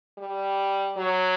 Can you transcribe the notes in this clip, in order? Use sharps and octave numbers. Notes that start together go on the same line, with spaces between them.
G3
F#3